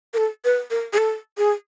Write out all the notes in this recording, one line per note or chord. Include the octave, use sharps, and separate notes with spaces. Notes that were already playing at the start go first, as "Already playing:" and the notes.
A#4
A4
B4
A#4
G#4
A4
G#4